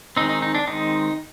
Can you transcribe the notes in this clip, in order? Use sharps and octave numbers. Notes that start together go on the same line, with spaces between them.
D#3 G#3 C4 D#4
D#4
D#4
D4
D#3 G#3 C4 D#4